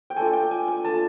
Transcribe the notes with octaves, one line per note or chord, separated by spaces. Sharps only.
G5
A3 D4 F4 G#5
G5
G#5
G#5
A3 D4 F4 A5